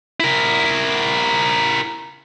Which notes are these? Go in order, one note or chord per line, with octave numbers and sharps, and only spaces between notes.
E4 A#4